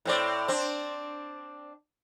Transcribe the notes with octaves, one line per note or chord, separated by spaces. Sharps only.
A2 C4 D5
C4 D4